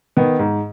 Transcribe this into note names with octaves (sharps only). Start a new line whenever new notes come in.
D#3 B3
G#2